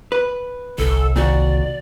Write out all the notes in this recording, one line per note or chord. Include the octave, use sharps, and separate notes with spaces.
B4
G1 C2 A4
A#2 D#3 F#4 D5